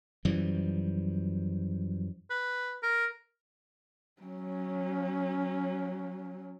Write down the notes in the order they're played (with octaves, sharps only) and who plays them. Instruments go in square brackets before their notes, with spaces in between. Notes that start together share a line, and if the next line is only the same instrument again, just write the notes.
[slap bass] F#2 E3 F3 G3
[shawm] B4
A#4
[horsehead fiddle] F#3 C#4